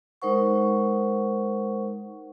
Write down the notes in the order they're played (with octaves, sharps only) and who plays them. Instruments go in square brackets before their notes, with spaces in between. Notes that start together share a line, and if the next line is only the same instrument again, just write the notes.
[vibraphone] G#3 D#4 A#4 C5 F#5 C#6